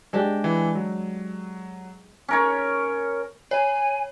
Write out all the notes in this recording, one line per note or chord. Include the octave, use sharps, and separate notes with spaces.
G#3 D4 G4
E3
F#3
C#4 A#4 C#5
C#5 G#5